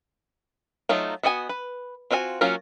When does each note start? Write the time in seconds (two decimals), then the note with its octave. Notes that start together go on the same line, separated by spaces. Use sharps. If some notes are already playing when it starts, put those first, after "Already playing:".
0.89 F#3 A3 D#4 F4
1.23 B3 F#4 D#5 G5 G#5
1.49 B4
2.11 C4 F4 F#4 F5 G#5
2.41 F#3 A#3 C#4 F4 F#4